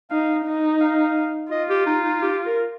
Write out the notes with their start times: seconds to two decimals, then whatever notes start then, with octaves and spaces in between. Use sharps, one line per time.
0.11 D#4 F5
0.46 D#4
0.81 F5
1.51 F4 D#5
1.70 G4
1.87 D#4
2.05 D#4
2.22 G4
2.46 A#4